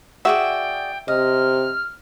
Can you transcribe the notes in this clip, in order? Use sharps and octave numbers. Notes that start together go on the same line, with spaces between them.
F#4 G#4 D5 E5 G5
C3 D#5 F6